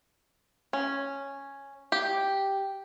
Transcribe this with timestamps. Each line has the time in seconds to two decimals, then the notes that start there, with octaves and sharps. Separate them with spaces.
0.73 C#4
1.92 G4